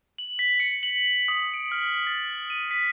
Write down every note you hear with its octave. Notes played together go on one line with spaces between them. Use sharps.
F#7
B6
C#7
F#7
D#6
D7
F6
A6
D#7
B6